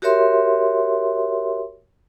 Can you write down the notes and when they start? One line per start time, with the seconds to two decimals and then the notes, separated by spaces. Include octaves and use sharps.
0.02 F#4 G4 A#4 C#5 E5 C6